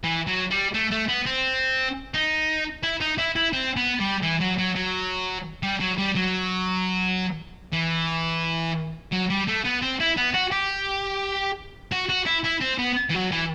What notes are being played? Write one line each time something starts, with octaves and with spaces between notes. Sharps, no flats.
E3
F#3
G3
A3
A3
B3
C4
D#4
E4
D#4
E4
E4
C4
B3
G3
E3
F#3
F#3
F#3
G3
F#3
G3
F#3
E3
F#3
G3
A3
B3
C4
E4
B3
F#4
G4
F#4
F#4
E4
E4
C4
B3
E3
F#3
E3